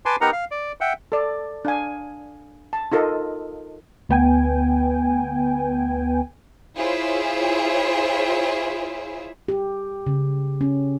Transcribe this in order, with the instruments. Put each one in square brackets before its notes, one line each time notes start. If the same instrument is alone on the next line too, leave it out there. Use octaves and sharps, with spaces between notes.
[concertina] B4 G#5 A5 C6 D6
B3 D#4 G4 A#4 F#5 A#5
F5
D5
E5 F#5 G5
[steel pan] A4 D5
D4 F5 G#5
A5
D#4 F4 A4 A#4 D#5
[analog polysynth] D2 B3 G5 G#5
[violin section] E4 F4 G#4 C5 C#5 E5
[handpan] G4
C#3
C#4